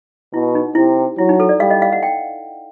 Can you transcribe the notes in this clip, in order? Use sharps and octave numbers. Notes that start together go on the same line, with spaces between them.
B2 E4
D#4
C3 E4
F#3 E4
D#4
A4
D5
G3 F5
D#5
F5
F#5
G5